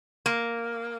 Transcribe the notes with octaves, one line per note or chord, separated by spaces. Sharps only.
A#3